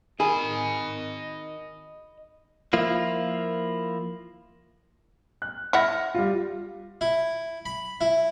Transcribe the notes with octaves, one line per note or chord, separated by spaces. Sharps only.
D#3 G#4 D#5 B5
F3 A#3 E4 F4
F#6
E4 E5 F#5 F6 A#6
G3 F4
E4
B5
E4